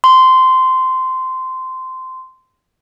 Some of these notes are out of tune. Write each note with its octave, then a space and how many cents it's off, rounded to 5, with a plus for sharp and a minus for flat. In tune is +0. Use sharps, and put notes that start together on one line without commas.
C6 -15